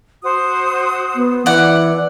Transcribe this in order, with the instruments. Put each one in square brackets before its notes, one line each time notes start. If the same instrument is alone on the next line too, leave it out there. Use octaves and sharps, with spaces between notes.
[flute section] F#4 C5 D#6
[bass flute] B3
[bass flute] E3 [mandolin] D5 F#5